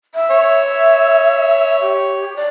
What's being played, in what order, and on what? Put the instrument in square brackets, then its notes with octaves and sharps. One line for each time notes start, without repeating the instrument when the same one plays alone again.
[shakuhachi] E5
[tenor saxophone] C#5
[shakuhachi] G4
D5